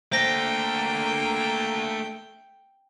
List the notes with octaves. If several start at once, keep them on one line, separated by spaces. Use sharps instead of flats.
A3 A#3 D4 C5 G5 A#6